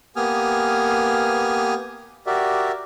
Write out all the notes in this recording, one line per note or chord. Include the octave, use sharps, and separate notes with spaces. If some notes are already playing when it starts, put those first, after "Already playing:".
A#3 B3 G4 G#5 D#6 F6
F#4 G4 A#4 D5 E5